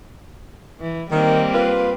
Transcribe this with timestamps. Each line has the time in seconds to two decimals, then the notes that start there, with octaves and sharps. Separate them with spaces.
0.80 E3
1.11 D#3 G3 A#3 C4
1.53 F4 B4